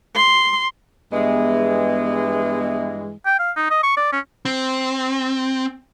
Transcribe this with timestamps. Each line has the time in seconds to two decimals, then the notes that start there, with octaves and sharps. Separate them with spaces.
0.15 C6
1.12 G2 E3 G#3 B3 E5
3.26 G5
3.39 F5
3.56 D#4
3.70 D#5
3.83 C#6
3.97 D5
4.12 C#4
4.45 C4